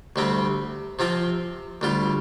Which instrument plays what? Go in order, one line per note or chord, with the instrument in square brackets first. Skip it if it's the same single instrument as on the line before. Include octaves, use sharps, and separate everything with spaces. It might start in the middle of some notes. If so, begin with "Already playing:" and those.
[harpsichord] D2 C3 G3 C4
C3 F3 C4 F4
D2 D3 G3 F4